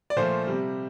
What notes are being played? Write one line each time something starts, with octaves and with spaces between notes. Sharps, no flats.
D5
A#2 F3 A3 C5
C3 G3